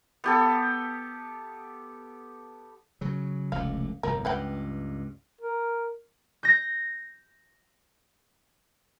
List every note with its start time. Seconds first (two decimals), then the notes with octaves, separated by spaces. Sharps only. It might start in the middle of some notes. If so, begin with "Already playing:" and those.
0.24 B3 G4 A4
3.01 C#3 F#3
3.52 F1 C#2 D3 F5
4.03 G1 C2 F2 A#4
4.25 C#2 G2 B4 F#5 G5
5.41 A#4
6.43 G6 A#6